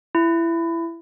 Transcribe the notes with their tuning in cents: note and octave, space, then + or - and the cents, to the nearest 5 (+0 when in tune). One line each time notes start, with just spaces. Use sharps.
E4 +20